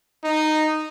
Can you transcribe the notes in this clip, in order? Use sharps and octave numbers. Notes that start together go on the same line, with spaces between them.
D#4